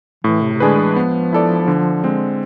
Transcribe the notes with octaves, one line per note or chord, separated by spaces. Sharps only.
A2 E3
C3
C3
D3 G#3 D4 G#4 B4
E3
F3 B3
E4 A4 D5
D3
G#3 C4